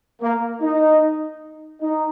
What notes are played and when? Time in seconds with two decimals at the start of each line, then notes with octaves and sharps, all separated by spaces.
0.22 A#3
0.62 D#4
1.82 D#4